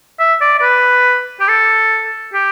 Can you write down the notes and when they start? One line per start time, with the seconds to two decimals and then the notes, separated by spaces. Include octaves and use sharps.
0.20 E5
0.41 D5
0.59 D5
0.62 B4
1.40 G4
1.48 A4
2.34 G4